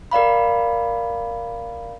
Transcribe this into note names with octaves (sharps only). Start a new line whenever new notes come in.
A#4 D5 F5 B5